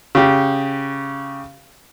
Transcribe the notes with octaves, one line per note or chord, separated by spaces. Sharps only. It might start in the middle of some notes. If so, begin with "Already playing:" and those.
C#3 G4